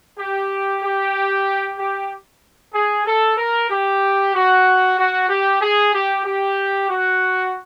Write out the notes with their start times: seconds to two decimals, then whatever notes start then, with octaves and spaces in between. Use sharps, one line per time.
0.18 G4
0.82 G4
1.79 G4
2.73 G#4
3.06 A4
3.37 A#4
3.69 G4
4.34 F#4
4.98 F#4
5.29 G4
5.62 G#4
5.93 G4
6.25 G4
6.89 F#4